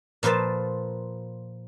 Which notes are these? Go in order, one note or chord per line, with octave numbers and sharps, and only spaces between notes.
A#2 F3 B4 C5 A5